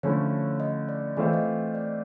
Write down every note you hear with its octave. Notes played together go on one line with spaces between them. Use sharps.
D3 F3 A3 C#4 E4 C#5
D#5
D5
E3 A3 C4 F4 A4 D#5
D#5
D5